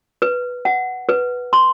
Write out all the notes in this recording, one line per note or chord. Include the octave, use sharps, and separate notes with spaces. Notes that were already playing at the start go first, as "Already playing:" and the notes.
B4
F#5
B4
C6